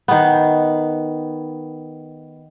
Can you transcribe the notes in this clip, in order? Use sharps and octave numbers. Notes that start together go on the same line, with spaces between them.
D#3 B3